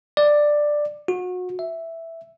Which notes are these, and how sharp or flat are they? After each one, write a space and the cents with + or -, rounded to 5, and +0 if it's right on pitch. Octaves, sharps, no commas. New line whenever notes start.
D5 +10
F#4 -30
E5 +0